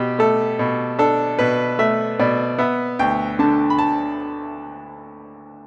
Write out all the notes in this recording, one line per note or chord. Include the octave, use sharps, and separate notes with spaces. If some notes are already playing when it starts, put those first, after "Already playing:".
Already playing: B2 G4
A3 A4
B2
D4 A4
B2 B4
A3 E5
B2 D5
B3 E5
D2 G5
D3 A5
B5
A5